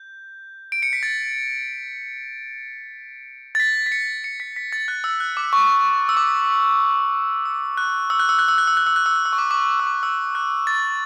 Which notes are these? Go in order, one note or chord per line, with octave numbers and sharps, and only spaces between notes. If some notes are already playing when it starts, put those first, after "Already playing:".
Already playing: G6
D7
C#7
B6
A6
A6
B6
B6
C#7
C#7
B6
B6
A6
F#6
E6
F#6
D6
C#6
E6
D6
E6
F#6
E6
F#6
E6
F#6
E6
F#6
E6
F#6
E6
F#6
E6
F#6
E6
C#6
D6
D6
C#6
D6
E6
D6
E6
F#6
A6